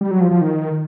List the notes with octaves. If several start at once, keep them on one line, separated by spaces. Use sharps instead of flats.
G3
F#3
F3
F3
D#3